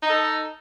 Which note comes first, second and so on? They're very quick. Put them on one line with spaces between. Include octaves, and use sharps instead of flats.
D#4 D#5 A4